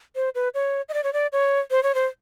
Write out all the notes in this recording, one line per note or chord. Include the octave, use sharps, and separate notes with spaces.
C5
B4
C#5
D#5
D5
C#5
D5
C#5
C5
C#5
C5